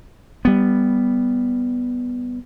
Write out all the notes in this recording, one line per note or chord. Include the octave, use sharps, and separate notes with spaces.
G3 B3